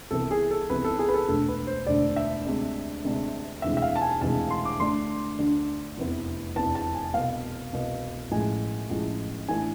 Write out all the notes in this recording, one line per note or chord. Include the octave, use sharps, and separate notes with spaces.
C2 C3 E3 B3 A4
G#4
A4
C2 C3 E3 B3 B4
A4
G#4
B4
A4
E1 D2 D3 A3 A4
B4
C5
E1 D2 D3 A3 D5
E5
D2 C3 G#3 D4
D2 C3 G#3 D4
E1 D2 C3 E3 G#3 E5
E5
F5
A5
G#5
E1 D2 C3 E3 G#3 A5
C6
D6
D2 D3 A3 D4 C6
D2 D3 A3 D4
F1 E2 C3 E3 B3
F1 E2 C3 E3 B3 A5
A5
G#5
C2 B2 B3 F5
C2 B2 B3
A1 A2 F3 G#3 G#5
A1 A2 F3 G#3
A2 E3 A3 D4 G#5